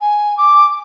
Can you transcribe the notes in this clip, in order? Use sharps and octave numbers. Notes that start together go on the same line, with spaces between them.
G#5
D6